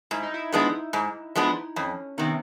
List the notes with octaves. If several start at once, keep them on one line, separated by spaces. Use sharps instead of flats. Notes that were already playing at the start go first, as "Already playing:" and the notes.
G#2 E4
D#4
E4
F3 G#3 B3 D4
G#2
F3 G#3 B3 D4
F2 C#4
C3 D#3 B3